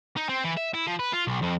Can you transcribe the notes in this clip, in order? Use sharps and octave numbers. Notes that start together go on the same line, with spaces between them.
D#4
C4
E3
E5
E4
F3
B4
F4
B1
F2